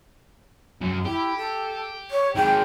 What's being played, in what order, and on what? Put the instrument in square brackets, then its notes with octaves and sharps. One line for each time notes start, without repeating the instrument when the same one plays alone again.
[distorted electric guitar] F#2
[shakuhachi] E4 [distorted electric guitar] G4
[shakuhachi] A4
C#5
[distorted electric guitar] D#3 G#3 [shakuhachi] G5